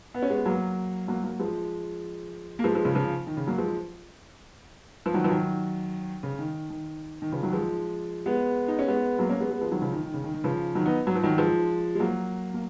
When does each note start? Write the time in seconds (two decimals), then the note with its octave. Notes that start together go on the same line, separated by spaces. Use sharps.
0.14 B3
0.22 C#4
0.30 G#3 B3
0.46 F#3 A#3
1.08 F#3 A#3
1.23 F#3 A#3
1.39 F3 G#3
2.59 A#3
2.64 F3 G#3
2.75 F3 G#3
2.85 C#3 F3
2.95 C#3 F3
3.27 D#3
3.37 C#3
3.47 F#3 A#3
3.58 F3 G#3
5.06 F3
5.14 D#3 F#3
5.24 F3
5.29 D#3 F#3
6.23 C#3
6.39 D#3
6.70 D#3
7.22 D#3
7.32 C#3 F3
7.43 D#3 F#3
7.53 F3 G#3
8.26 G#3 B3
8.68 D#4
8.79 C#4
8.88 G#3 B3
9.19 F#3 A#3
9.29 A#3 C#4
9.40 G#3 B3
9.50 G#3 B3
9.61 F3 G#3
9.71 D#3 F#3
9.81 C#3 F3
9.92 D#3
10.03 D#3
10.14 C#3
10.24 D#3
10.34 D#3
10.44 C#3 F3
10.75 D#3 F#3
10.85 B3 D#4
11.07 F#3
11.16 F3
11.23 D#3 F#3
11.37 F3 G#3
11.95 G#3
12.00 F#3 A#3
12.54 A#3